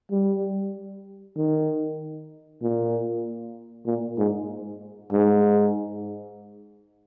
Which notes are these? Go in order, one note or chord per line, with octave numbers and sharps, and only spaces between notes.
G3
D#3
A#2
A#2
G#2
G#2